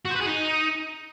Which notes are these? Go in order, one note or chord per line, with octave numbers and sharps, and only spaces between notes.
F#4
C5
B4
G#4
D#4